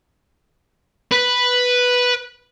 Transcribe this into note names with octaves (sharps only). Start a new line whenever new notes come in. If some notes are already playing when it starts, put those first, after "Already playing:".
B4